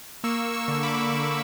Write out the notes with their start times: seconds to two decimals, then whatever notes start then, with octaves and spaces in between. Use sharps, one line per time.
0.24 A#3 C#6 E6
0.53 C#6 E6
0.68 D3
0.83 B5 D6
1.12 D3